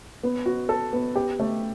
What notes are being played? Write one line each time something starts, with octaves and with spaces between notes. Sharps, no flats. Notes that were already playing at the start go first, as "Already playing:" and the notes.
B3
F#4
A4
B3
G4
A3